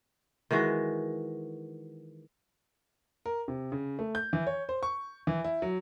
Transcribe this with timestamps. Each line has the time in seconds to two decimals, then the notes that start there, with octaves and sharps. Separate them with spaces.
0.51 D#3 E3 G#3 F#4
3.26 A#4
3.48 C3
3.72 C#3
3.99 A3
4.15 G6
4.33 E3
4.47 C#5
4.69 C5
4.83 C#6
5.27 E3
5.44 E4
5.62 F#3